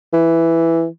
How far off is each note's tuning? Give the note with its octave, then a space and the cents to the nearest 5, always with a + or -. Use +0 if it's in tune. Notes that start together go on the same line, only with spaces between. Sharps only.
E3 +5